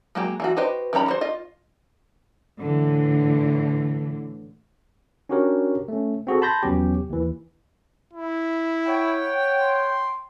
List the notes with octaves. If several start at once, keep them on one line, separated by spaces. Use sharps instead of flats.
F#3 G#3 A#3 F#4 G4
E3 F4 F#4
F#4 G4 B4 C5 D#5
D#3 C#4 G4 A#5 B5
F#4 C5
F4 D#5
A2 D3 E3
C#4 D4 F#4 G4 A#4 C#5
A3 C#4
C4 F#4 G#4 A4
A5 B5 C6 G6 A6 A#6
E2 F3 F#3 B3 C#4 G4
D#2 E3
E4
C#5 F#5 G5
C6